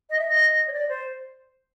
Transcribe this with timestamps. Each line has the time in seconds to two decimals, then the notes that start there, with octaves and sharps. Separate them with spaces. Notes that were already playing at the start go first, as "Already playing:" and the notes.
0.10 D#5
0.18 E5
0.28 D#5
0.67 C#5
0.73 D5
0.89 C5